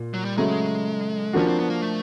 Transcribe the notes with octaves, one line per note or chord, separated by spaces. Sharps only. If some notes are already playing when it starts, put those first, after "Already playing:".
Already playing: A#2
F#3
G3
C#3 F#3 G#3 A3
F3 A#3 C#4 D4 F#4
C4
B3
A#3
A3